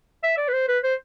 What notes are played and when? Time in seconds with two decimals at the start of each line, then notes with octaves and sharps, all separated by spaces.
0.23 E5
0.37 D5
0.48 B4
0.53 C5
0.68 B4
0.84 C5